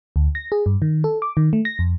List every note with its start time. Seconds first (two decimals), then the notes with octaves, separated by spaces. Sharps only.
0.16 D2
0.35 A#6
0.52 G#4
0.66 G2
0.82 D#3
1.04 A4
1.22 D6
1.37 D#3
1.53 A3
1.65 A#6
1.79 F2